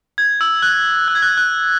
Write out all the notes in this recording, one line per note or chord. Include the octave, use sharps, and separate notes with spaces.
G#6
E6
F#6
F#6
G#6
F#6
F#6